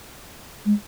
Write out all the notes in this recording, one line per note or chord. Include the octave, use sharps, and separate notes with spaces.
G#3